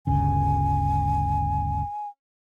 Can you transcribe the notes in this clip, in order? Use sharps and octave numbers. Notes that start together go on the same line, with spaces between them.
G1 D2 C#3 G#5